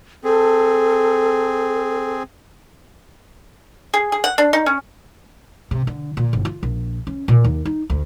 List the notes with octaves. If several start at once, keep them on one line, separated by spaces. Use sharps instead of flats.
C4 G#4 A4
G#4
G#4
F#5
D4
D#4
C#4
C3
D3
A#2
G1
F4
A#1
C#4
A#2
D#2
D#4
D2